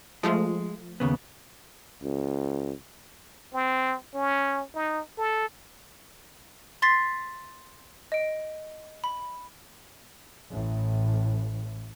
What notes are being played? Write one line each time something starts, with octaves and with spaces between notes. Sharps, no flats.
F3 G#3 A3 F4
D#2 C#3 B3
C#2
C4
C#4
D#4
A4
C6 A6 B6 C7
D#5 D7
B5
A1 A2